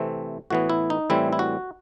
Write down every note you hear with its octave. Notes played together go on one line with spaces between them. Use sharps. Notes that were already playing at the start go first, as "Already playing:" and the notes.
Already playing: C3 E3 A3 C4
A2 E3 B3 F#4
E4
D#4
A2 E3 G3 C4 E4
E4
F#4